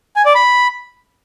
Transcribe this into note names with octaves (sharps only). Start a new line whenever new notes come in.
G#5
D5
B5